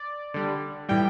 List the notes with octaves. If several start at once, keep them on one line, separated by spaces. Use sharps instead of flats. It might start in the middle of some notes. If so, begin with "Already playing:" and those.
Already playing: D5
D3 G3
A2 E3 G3 G5